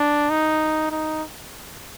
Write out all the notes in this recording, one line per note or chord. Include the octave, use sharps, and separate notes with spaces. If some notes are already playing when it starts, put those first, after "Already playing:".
Already playing: D4
D#4
D#4